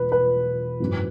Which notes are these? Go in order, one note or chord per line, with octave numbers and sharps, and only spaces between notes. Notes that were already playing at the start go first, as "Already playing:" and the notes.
Already playing: E1 B4
B4
G#1 F#2 E3